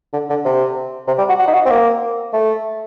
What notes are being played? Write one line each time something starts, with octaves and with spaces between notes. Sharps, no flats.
D3
D3
C3
C3
G3
F#4
F#4
D#4
F#4
C4
A#3
A3